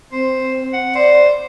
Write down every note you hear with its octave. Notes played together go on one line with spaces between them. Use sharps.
C4 C5
F#5
C5 D5